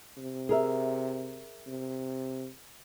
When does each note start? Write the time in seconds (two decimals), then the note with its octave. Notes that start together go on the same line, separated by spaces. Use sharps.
0.17 C3
0.49 G#4 A#4 E5
1.67 C3